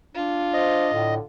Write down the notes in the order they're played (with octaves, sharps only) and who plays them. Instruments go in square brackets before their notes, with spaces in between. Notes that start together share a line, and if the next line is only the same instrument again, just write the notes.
[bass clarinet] D4 [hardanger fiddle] F4
[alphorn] C5 [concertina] D#5
[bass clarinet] A2 [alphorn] D3